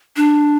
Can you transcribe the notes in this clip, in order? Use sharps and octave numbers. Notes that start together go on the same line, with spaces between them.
D4